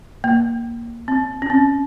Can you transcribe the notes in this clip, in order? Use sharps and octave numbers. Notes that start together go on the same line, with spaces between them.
A#3
C4
C#4
C4